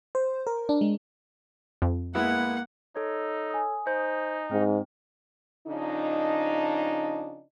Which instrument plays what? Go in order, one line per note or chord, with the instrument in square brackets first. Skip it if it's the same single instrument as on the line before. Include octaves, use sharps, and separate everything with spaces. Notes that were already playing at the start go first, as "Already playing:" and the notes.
[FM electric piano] C5
A#4
D4
G#3
[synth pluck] F2
[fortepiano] G#3 B3 E4 [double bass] A#3 [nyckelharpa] F#5
[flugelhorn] D#4 [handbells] A4 C#5
[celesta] G#5 D#6
[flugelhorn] D#4 [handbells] C5
[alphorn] G#2 [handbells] C4
[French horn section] C#3 F3 D4 D#4